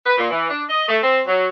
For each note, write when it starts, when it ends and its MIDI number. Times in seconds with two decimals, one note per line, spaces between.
0.06 0.17 71
0.18 0.27 46
0.30 0.50 52
0.50 0.64 62
0.69 0.86 75
0.89 0.98 57
1.02 1.21 60
1.27 1.48 54